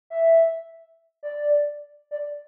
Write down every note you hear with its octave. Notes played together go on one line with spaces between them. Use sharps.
E5
D5
D5